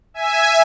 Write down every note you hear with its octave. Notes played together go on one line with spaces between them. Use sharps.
E5 G#5